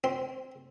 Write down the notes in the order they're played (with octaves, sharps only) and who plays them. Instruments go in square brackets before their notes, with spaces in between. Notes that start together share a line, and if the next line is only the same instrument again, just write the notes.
[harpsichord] C4